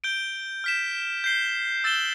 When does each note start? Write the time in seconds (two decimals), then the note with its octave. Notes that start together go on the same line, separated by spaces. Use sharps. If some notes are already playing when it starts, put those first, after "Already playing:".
0.04 G6 D7 G7
0.64 F6 B6 E7
1.24 G6 C7 G7
1.84 E6 A6 E7 G7